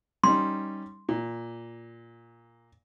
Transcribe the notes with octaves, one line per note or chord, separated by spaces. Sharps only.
G3 C#4 D#4 C6
A#2